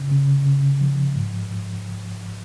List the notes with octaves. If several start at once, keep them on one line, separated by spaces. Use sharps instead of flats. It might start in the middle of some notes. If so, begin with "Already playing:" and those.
Already playing: C#3
C#3
C#3
F3
G#2